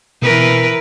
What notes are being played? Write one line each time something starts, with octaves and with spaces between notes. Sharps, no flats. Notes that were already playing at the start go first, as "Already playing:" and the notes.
B2 E3 A#4 B4